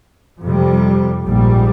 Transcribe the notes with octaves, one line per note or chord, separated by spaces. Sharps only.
F2 C3 G3
A#1 G#2 G3